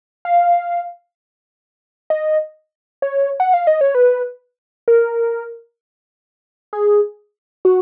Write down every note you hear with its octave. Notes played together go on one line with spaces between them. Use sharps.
F5
D#5
C#5
F#5
F5
D#5
C#5
B4
A#4
G#4
F#4